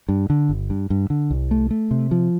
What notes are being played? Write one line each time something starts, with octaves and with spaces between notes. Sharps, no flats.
G2
D3
G1
G2
G2
D3
C2
A3
A3
C3
F3